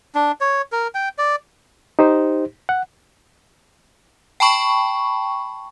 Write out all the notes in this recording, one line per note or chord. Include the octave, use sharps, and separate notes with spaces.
D4
C#5
A#4
G5
D5
D#4 G4 C5
F#5
G5 A5 B5 C#6